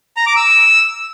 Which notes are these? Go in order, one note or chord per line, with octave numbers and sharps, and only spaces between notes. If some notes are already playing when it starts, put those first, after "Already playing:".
A#5
D6
E6